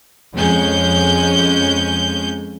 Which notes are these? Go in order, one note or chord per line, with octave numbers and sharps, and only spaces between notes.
F2 G#3 C#4 G6